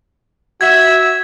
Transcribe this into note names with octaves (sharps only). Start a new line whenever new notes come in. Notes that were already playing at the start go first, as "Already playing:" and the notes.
F#4 E5 G#6